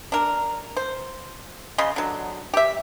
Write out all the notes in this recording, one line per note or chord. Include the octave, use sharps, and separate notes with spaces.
D4 A#4
C5
C#3 D#5 C6
D3 F#3
G4 E5